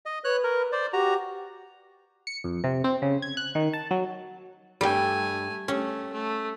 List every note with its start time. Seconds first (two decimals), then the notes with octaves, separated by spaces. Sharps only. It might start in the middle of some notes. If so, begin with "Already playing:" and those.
0.06 D#5
0.24 B4 C#5 F#6
0.44 A#4
0.72 C5 D5
0.93 F#4 G4 A#5
2.27 C#7
2.44 F2
2.64 C3
2.84 C4
3.02 C#3
3.22 G#6
3.37 F#6
3.55 D#3
3.73 A5
3.91 F#3
4.81 G2 G3 A3 A4 G5 G#5
5.68 A3 C#4 G4
6.13 A3